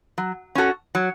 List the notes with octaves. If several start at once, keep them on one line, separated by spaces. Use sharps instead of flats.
F#3
C#4 F#4 A4
F#3